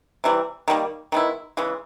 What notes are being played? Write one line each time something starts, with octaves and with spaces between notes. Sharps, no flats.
C3 E3 G3
D#3 G3 A#3
D#3 G#3 B3 E4
C#3 E3 G#3